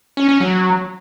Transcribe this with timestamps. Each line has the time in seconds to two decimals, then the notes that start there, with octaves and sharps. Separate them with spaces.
0.17 C#4
0.29 C#4
0.40 F#3